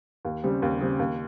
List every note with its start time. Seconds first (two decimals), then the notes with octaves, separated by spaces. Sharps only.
0.25 D#2
0.44 C#3 G3 C4
0.62 D#2
0.80 C#3 G3 C4
0.99 D#2